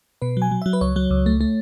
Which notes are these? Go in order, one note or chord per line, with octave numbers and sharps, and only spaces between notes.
B2 B4
F#3 G#5
F#3
F#3 E5
B4
C#2 C#5
F#3
C#2
A3
A3